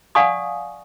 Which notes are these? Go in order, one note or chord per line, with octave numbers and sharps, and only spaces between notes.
D5 F5 F#5 G#5 C#6 D#6